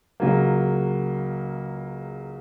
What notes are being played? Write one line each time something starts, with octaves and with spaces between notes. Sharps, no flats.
C#2 C#3 F#3 A#3